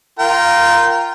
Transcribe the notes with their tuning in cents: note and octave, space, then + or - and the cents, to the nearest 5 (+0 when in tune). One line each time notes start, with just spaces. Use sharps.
F4 -5 A#4 +0 G5 -25